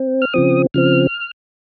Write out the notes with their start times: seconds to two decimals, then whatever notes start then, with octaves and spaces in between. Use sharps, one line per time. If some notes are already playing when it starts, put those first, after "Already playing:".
Already playing: C4
0.22 F6
0.33 C#3 F3 C4 D#6
0.74 C#3 F3 C4 F6